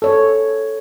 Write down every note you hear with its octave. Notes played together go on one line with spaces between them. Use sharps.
A4 C#5